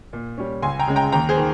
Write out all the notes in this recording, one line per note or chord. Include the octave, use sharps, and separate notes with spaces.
A#2
G3 C#4
C#2 G#5 C6
G5 A#5
C#3 G#3
G5 A#5
D#2 G5 A#5
G#4 C5
D#3